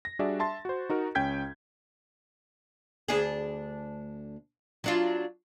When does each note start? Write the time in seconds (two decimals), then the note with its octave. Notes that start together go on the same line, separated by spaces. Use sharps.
0.05 A#6
0.19 G3 D4 F#4 G#4 D5 E5
0.39 E5 A5 C6 A6
0.65 F#4 C5
0.90 D#4 F#4 A#4 F#5
1.15 C#2 C#4 G5 G6 G#6 B6
3.08 D2 D4 G#4
4.84 F#3 D4 F4